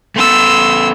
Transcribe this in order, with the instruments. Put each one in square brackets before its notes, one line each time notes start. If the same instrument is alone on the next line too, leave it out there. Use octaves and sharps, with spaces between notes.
[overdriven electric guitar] A3 B3 [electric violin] C6 E6